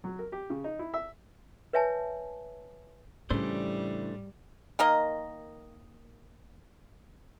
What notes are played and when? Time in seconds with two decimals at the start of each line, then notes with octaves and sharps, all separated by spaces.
0.04 F#3
0.19 A#4
0.32 G4
0.50 C#3
0.64 D#4
0.79 E4
0.94 E5
1.73 B4 C#5 E5 G#5 A5
3.30 A2 C#3 E3 G3 A3 D4 C5
4.79 D#3 A#3 A#4 D#5